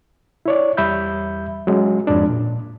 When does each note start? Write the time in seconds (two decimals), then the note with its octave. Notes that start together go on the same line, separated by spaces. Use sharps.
0.46 E4 C#5 D5
0.77 E2 G3 E5 B5 G6
1.67 F#3 G#3 C#4
2.07 F2 G#2 G#3 D4
2.29 A#2